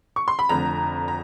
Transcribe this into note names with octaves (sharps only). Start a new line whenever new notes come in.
C#6
C6
B5
F1 F2 D3 A#5
A#5